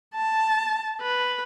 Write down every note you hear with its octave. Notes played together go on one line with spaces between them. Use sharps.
A5
B4